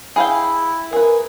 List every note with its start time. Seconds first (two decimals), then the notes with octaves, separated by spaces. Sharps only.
0.16 E4 G#4 F5 G5
0.93 G#4 A#4 B4